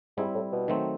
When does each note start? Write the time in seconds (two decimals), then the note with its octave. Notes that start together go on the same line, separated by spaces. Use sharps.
0.17 G#2 G3 C4 E4
0.35 A2
0.52 B2
0.68 D#3 F#3 A3 C4